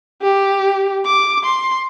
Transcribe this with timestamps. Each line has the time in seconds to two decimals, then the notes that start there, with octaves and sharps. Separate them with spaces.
0.22 G4
1.06 D6
1.44 C6